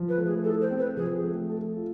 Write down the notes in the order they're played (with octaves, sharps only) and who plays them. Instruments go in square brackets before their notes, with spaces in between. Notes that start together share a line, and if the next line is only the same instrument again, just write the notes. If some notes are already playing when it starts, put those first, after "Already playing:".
Already playing: [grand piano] F3
[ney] B4
[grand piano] A3
[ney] G#4
[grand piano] E4 [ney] A4
[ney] C5
[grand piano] C4
[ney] B4
[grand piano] F3 [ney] G#4
[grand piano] A3
A4
F4